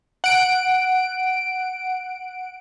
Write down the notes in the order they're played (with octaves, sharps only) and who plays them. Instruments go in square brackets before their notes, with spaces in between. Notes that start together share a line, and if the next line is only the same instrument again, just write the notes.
[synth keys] F#5 D7